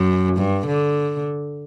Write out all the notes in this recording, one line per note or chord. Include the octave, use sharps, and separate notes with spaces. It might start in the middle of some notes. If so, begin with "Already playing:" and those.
Already playing: F#2
G2
D3